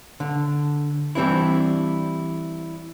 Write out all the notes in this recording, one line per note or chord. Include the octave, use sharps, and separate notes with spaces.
D3
E3 G3 C4 D4 E4